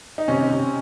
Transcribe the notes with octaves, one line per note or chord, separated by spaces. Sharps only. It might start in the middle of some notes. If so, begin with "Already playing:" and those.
D#4
C3 C#4
C3